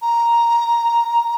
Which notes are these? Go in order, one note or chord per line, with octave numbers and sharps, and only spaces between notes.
A#5